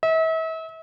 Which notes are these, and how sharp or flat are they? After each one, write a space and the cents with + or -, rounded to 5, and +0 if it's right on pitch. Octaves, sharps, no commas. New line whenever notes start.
E5 -40